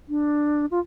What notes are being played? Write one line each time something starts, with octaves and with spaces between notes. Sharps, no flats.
D4
F4